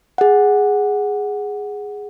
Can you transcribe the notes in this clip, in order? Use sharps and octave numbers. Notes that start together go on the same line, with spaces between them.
G#4 F#5